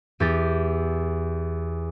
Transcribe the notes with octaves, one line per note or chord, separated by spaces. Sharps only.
E2 G4 A6